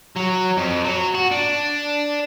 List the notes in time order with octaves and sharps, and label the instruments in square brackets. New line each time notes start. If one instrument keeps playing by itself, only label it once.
[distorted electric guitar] F#3
F2
F#3
F#4
D4